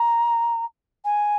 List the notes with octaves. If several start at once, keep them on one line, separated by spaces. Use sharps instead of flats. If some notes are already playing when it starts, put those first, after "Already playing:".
Already playing: A#5
G#5